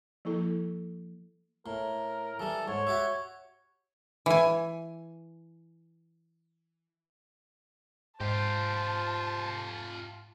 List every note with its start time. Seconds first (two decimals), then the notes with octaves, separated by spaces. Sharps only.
0.25 F3 A#3 E4 A4
1.66 A2 A#4
2.40 E3 G3 A4
2.68 G#2 C#5
2.87 F#4 G4 E5
4.26 E3 G#5
8.21 G#2 F4 G4 C5 A5